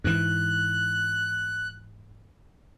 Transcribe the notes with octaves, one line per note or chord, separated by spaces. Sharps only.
G#2 E3 F#6